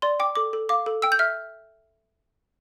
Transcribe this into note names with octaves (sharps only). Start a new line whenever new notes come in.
D5 C6
G5 D6
A4 D6
A4
F5 D6
A4
G5 E6
G6
E5 F6